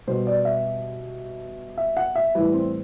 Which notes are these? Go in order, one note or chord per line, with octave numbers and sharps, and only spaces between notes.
B2 G3 C5
D5
E5
E5
F#5
E5
A2 E3 G3 B4
C4